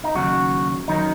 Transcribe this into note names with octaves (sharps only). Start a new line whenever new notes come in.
D#4
D#2 C#3 F#3 F#4
F#2 D#3 F#3 D#4